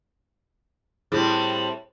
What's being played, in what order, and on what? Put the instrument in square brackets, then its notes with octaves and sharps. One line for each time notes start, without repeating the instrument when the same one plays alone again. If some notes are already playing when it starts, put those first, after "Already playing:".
[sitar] A2 G3 C4 [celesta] E4 G#4